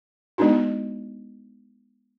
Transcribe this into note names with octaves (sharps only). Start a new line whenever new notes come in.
G#3 B3 D4 D#4 F#4